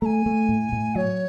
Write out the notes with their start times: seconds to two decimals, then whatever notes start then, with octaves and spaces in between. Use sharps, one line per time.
0.01 A3 G#5 A#5
0.26 A3
0.49 A2
0.72 A2
0.95 F#3 C#5